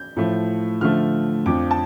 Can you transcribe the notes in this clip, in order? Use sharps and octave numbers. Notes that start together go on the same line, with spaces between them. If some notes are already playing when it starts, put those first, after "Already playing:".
Already playing: G6
A2 F3 A3
D3 F3 A3 F6
F2 F3 D4 D6
A5